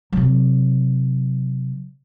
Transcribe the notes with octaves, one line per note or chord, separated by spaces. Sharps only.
C3 F#3